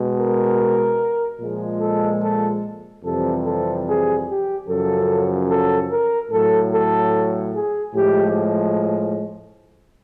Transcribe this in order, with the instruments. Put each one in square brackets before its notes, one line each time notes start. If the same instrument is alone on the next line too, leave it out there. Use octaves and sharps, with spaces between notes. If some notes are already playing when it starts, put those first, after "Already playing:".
Already playing: [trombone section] B2 G#3
A#4
A#2 F3 G#3
A4
A4
F2 C3 E3 G3 A4
A4
G#4
G4
F#2 C#3 F3 A4
A4
A#4
A2 F#3 A4
A4
G#4
A2 F3 G#3 G4